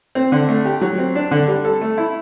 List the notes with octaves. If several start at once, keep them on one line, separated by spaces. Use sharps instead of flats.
C4
D3
A3
G4
F#3
C4
D4
D3
G3
A4
A3
E4